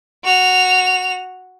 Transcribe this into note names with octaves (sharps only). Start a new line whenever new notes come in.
F#4 F7